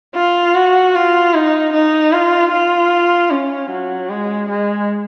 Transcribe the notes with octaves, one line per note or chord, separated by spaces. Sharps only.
F4
F#4
F4
D#4
D#4
F4
F4
C#4
F#3
G#3
G#3